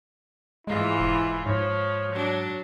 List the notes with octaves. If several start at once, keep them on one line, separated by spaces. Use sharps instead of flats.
G#2 E3 G#3 E4 F4
E1
G#2 F3 C#5
F#3 D4